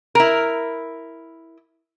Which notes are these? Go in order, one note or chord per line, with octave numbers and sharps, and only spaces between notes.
E4 A#4